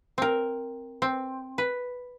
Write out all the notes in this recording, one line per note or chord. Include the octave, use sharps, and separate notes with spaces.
C4 A#4
C4
B4